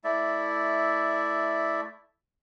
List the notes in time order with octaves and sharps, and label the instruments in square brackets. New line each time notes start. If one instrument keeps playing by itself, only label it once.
[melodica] A3 E4 D5 E5